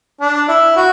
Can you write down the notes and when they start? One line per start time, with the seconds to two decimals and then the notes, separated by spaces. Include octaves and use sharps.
0.21 D4
0.49 E4
0.76 F#4